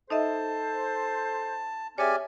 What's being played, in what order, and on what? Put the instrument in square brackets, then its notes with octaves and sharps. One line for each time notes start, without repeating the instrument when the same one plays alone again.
[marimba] D#4 D#5 E5 [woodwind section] A4 C5 [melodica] A5
[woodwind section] C4 G#4 F6 [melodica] G4 D5 G#5 [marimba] C#5 E5